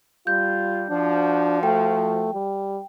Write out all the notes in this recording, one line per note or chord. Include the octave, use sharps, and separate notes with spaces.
G3 F4 G6
F3 D4 F#4
A3 G5
G3